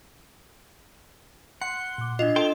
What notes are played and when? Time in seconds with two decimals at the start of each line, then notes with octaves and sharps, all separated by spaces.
1.61 F#5 C6
1.98 A#2 D6
2.19 D4 F4 D#5
2.36 A4 G5 C6